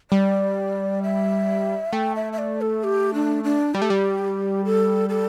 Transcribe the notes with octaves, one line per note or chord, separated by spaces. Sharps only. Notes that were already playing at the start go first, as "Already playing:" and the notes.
G3 D5
E5
A3 G5
E5
E5
D5
A4
G4
D4
D4
G3 G4
A3
G3
A4
A4